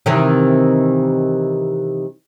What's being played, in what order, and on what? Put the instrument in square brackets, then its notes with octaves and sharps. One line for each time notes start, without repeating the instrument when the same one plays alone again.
[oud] C3 D#3 E3